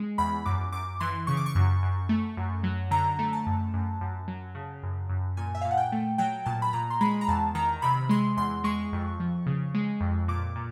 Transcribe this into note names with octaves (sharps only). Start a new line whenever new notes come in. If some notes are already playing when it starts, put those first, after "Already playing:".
Already playing: G#3
E2 B5
F#2 D6
F#2 D6
E3 C6
C#3 C#6
D6
C#6
F#2
F#2
A3
F#2
F#3
D3 A#5
A3
A5
F#2
F#2
F#2
F#3
C#3
F#2
F#2
A#2 G#5
E5
F5
A#2
F#5
G5
A3
F#3 G5
A#2 A5
B5
A#2 A#5
C6
G#3 B5
A#5
E2 A5
D#3 A#5
C3 B5
G#3 C6
E2 C6
G#3 C#6
F2
F3
C#3
G#3
F2
A#2 D6
A#2